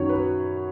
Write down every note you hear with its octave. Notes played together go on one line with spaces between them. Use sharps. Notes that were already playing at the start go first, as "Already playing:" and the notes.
Already playing: F#2 D#3 F#3 C#5
B4